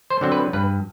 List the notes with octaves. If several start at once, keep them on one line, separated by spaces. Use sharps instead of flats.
C5
D3 F#3 C4
B4
G2 B4